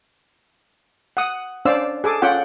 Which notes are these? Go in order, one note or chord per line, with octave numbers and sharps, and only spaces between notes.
F#5 D#6
C#4 D4 C5 D5 F5 E6
G#4 A4 D6
C#4 F4 F#5 G5